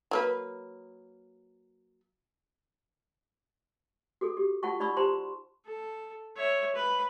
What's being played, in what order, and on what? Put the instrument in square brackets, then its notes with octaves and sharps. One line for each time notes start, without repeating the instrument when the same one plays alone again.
[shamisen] F#3 A#3 B4
[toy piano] F#4 G#4 A4
G4
F4 F#5 A5 C#6
D#4 D5 B5 C#6 E6
G4 C5 A5 A#5 C6
[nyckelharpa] A4
C#5 E5
B4 B5